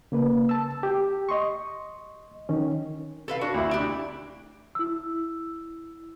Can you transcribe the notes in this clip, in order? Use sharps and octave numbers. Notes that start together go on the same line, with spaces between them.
C#3 A#3 B4
A5 E6
G4
D#5 C6 C#6
D#3 C#4
A4 B4 F5
D4 F#4
D2 E4
D4 G4
E4 E6